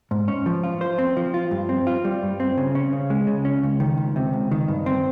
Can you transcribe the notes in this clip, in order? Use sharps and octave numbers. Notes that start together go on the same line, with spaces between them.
G#2
C#4
F3
F4
C5
C4
F3
F4
G2
C4
F4
G3
G2
C4
C#3
C#4
C#3
G#3
C#3
C#4
C#2
D#3
C#2
C3
C#2
D#3
G2
C4